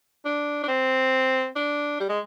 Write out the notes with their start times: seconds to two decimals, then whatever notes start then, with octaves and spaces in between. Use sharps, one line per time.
0.25 D4
0.63 D4
0.68 C4
1.56 D4
2.00 G3
2.09 G#3